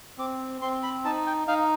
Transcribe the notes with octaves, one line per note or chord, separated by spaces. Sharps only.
C4 D6
C4 C6
B5
D#4 A5
G5
D#4 F5